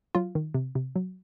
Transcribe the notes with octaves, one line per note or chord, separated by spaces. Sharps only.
F#3 F4
D#3
C3
C3
F#3